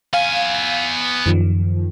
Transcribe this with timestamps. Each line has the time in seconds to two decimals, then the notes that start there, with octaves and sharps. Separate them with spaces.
0.13 B3 F5 G#5
1.26 F#2 D#3 F3